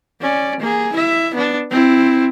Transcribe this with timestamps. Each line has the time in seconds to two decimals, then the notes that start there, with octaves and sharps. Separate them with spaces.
0.21 C#4 D5
0.60 A#3 G#4
0.93 E4 E5
1.34 B3 D4
1.70 C4 E4